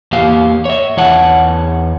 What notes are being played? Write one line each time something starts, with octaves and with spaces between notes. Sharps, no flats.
E2 A#3 G4 F5
C#5 E5
E2 C#5 F#5 A5